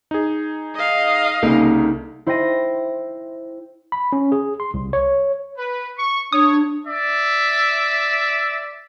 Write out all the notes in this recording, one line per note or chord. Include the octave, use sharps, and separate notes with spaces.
D#4 G#4
D#5 F5
C2 C#3 A#3 D#4 A4
E4 C5 E5 G5 A#6 D#7
B5
C#4
G#4
C6
C2
C#5
B4
C#6
D4 C#5 D#6
D5 E5